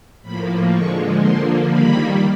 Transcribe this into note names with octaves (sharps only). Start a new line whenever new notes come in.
A2 F3 A#3 B5
D3 F3 G#3 C#6
D3 F3 A#3 C6
D#3 G3 A#3 B5